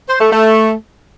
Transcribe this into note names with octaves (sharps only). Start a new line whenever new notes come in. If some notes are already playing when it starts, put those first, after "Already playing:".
C5
A3
A3